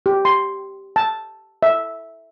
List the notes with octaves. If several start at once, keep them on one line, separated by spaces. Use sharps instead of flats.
G4
C6
A5
E5